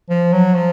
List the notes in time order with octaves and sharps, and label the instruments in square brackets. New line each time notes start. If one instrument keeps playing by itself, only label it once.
[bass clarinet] F3
F#3
F3